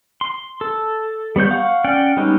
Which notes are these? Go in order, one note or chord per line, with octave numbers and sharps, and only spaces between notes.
C6
A4
G3 B3 C#5 G6
F5 F#5 C#6
C#4 D5 F#5 G5 F6
G3 G#3 B3 C#4 D#4